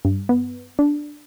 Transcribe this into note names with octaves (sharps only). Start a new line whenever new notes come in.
G2
B3
D4